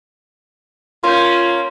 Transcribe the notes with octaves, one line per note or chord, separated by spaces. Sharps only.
A#3 C#4 F4 C6 G6